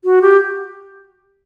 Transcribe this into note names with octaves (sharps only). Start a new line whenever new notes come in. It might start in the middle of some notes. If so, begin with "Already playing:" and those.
F#4
G4